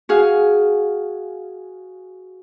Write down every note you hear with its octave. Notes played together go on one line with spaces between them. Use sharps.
F#4 G#4 F5